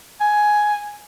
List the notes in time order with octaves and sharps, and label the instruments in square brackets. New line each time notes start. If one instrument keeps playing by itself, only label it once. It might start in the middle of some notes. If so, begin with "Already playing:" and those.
[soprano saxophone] G#5